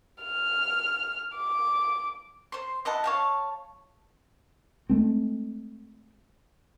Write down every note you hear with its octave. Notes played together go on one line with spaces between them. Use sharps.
F6
D6
C5 C6
E4 D#5 F#5 A5
C#5 F5 A5
G#3 A3 C4